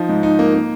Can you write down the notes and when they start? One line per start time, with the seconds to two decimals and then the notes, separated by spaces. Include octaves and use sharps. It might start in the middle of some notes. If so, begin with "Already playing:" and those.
Already playing: F3 D#4
0.09 G#2
0.23 D#4
0.39 A#3
0.54 A#3